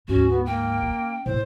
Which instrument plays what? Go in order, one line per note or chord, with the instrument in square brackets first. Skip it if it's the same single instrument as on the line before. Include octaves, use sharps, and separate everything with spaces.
[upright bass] D2 G#2 [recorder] C#4 [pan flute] F#4
[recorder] B3
[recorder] A#3 [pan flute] G5
[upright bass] C#4
[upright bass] A2 [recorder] C5